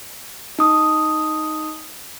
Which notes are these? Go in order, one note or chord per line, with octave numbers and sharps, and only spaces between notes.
D#4 D#6